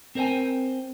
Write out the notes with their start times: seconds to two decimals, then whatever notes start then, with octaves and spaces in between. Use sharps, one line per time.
0.15 C4 A#4 C5 C#5 G5 G#5